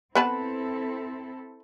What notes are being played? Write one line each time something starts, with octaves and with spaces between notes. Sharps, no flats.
B3 C4 E4 A4 B4 A5